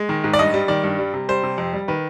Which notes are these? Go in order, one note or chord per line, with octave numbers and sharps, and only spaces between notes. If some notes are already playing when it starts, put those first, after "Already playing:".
Already playing: G#3
D#3
G#2
D5
G2 D#5
G3
D#3 D5
G2
G3
C3
G3 C5
C3
F2
G3
D#3 B4